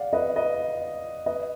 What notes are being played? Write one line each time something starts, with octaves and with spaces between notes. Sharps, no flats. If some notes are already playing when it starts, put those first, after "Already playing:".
Already playing: D5 F5 F#5
B4 D#5
B4 D#5
B4 D#5